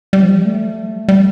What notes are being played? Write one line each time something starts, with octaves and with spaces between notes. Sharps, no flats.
G3
F3
G3
A3
G3